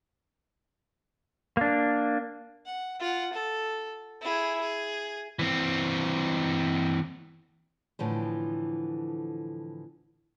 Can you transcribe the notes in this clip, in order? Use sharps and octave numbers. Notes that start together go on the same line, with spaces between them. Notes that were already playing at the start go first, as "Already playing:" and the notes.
A#3 D4
F#5
F4 F#5
A4
E4 G#4
G#4
E3 C4
A2 D3 E3 F3